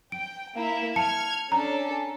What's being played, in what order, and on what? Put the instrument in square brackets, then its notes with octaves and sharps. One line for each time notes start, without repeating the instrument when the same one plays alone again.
[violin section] G5 [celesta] D7
[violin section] A#3 E4 E5
[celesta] A5 C#7 [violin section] F6 G#6
[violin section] C#4 D4 A4 [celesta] A#5